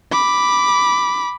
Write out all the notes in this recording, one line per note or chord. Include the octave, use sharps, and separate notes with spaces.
B5 D6